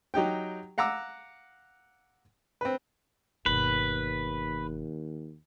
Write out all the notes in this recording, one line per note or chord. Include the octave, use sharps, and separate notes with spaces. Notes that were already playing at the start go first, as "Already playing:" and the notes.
F#3 D#4 G4 G5
F5 F#5 A#5 D6 E6
C4 B4
G1 D#2 B2 B4